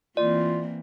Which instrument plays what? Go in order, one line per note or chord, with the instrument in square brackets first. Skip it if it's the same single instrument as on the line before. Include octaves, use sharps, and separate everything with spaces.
[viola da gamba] E3 A#3 C4 [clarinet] F4 [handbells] D5